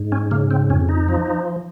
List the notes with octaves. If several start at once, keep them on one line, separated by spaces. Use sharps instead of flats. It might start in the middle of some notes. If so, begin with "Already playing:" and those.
Already playing: G#2
C#4
C#3 A#3
C4
F2 C#4
D#4
F3